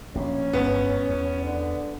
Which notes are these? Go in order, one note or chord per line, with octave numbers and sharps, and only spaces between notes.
A#1 B2 C#4
G1 G2 G#3 B3
E2
D3